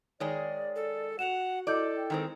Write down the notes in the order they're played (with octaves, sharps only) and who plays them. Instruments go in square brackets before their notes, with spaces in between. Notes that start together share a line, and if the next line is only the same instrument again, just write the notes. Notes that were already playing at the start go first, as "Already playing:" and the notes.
[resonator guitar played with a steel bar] D#3 G#3 G#4 [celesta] C#5 [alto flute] D5
[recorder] A4
[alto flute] F#4 [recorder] F#5 [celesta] E7 F7
[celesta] E4 D#5 G6 [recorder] A4 [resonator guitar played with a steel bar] D5
[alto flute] G5
[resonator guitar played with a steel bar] D#3 G#3 C4